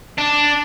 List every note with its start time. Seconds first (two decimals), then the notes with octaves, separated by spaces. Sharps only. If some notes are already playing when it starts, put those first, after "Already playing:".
0.18 D4